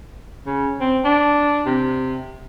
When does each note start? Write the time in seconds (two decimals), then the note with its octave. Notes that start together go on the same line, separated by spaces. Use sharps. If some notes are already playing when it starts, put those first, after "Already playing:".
0.47 C#3
0.80 C4
1.05 D4
1.66 C3